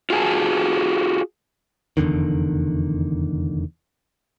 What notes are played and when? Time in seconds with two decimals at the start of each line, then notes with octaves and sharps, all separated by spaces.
0.10 F4 F#4 G#4 F5 G#5 A5
1.97 F1 E2 D3 D#3